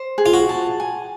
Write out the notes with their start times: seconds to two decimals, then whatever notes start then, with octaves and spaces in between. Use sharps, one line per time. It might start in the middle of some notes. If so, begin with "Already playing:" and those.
Already playing: C5
0.18 G#4
0.26 F4
0.34 F#4
0.49 A5
0.80 G#5